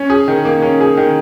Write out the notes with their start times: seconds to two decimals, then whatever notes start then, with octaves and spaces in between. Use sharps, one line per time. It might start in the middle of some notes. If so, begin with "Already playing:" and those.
Already playing: C#4
0.10 G#4
0.28 D#3
0.45 A#3
0.62 C#4
0.80 G#4
0.97 D#3